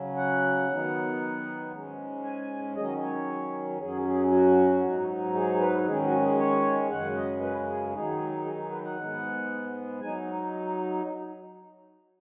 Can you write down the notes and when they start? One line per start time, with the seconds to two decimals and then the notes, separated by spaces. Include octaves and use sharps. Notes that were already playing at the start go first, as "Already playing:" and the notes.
Already playing: C#3 F#3 C#4
0.16 F#5
0.69 D#3 F#3 B3 D#4
1.72 G#2 G#3 C#4
2.24 G#5
2.75 D#3 F#3 C#4 D#5
3.02 C#5
3.79 F#2 F#3 C#4 G#4
4.05 G#4
4.31 F#4
4.83 G#2 F#3 D#4
5.35 G#4
5.60 B4
5.86 D#3 G#3 C#4 G#4
6.03 F#4
6.21 G#4
6.38 C#5
6.90 F#2 C#3 G#3 C#4 F#5
7.16 D#5
7.41 B4
7.67 G#4
7.93 D#3 F#3 D#4 G#4
8.45 G#4
8.58 G#4
8.71 B4
8.84 F#5
8.97 G#2 G#3 B3
10.01 F#3 D#4 G#5